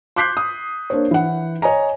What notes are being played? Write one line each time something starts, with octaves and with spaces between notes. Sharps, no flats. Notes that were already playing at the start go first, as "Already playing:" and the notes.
C6 D6 F#6 G6 B6 C7
D#6
A#3 D4 C5 C#5
E3 F#5
C#5 D#5 G#5 A#5